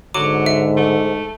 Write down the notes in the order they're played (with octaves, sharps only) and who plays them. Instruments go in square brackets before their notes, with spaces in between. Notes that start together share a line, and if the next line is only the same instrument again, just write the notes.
[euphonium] G#2 [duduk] D3 [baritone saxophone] F#3 [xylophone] D6
[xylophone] E5
[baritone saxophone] A3